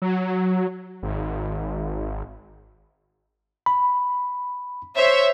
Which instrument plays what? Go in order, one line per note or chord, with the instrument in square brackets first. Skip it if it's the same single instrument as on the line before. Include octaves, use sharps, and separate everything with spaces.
[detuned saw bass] F#3
G#1
[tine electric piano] B5
[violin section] C5 C#5 E5